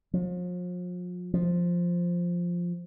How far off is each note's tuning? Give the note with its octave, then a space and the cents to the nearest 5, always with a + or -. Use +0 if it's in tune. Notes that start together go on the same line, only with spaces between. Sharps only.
F3 +40
F3 +0